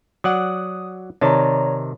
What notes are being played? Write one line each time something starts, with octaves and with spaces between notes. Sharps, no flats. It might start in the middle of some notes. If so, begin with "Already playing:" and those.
F#3 D5 F#5 D#6
C3 D#3 C#5 D5 A5 A#5